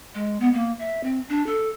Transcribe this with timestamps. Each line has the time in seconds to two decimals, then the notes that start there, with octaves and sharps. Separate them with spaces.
0.15 G#3
0.40 B3
0.54 A#3
0.79 E5
1.04 C4
1.29 D4
1.46 A4